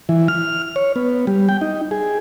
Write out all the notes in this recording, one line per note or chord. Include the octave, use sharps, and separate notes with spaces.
E3
F6
C#5
B3
G3
G5
D#4
G#4